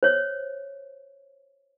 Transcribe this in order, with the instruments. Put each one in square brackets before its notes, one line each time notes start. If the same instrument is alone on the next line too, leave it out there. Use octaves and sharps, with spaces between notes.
[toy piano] C5 C#5